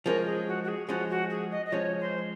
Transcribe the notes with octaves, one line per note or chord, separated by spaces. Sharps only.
F3 G#3 C#4 A#4
G#4
F#4
F#4
G#4
F3 G#3 C#4 F#4
F#4
G#4
D#5
D#5
F3 G#3 C#4 C#5
C5